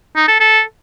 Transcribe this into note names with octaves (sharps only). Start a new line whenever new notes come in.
D#4
A4
A4